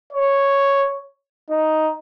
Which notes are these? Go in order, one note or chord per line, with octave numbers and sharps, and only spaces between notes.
C#5
D#4